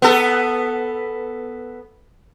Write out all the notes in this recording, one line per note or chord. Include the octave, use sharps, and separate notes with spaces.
B3 A4